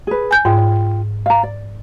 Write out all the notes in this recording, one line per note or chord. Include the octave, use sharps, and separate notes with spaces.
G#4 B4
G#5 G6
G#2 F4 G5
F5 A#5
D5